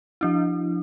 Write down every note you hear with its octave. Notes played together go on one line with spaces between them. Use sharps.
F3 D4 E4